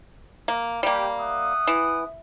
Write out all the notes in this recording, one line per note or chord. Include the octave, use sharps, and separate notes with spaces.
A#3
G3 A#3 G4
E5 F#5 D#6
E3